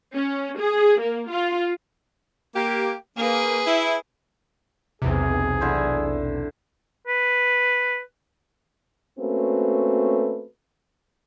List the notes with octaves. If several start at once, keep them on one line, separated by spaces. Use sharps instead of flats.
C#4
G#4
A#3
F4
A#3 G4
A#3 G#4 B4
E4
B1 E2 C3 G#4
D3 E4 C5
B4
A3 A#3 C4 C#4 F#4 B4